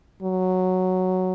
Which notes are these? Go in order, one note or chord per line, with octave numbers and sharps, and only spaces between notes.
F#3